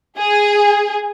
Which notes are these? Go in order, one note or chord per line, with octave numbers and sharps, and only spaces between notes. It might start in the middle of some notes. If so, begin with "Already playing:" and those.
G#4